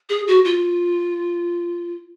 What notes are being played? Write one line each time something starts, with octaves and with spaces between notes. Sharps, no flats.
G#4
F#4
F4